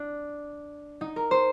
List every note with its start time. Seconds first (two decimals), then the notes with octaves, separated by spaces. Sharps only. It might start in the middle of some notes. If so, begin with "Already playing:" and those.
Already playing: D4
1.01 D#4
1.16 A#4
1.31 C5